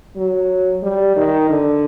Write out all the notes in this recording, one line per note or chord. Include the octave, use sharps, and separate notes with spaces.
F#3
G3
D#3
D3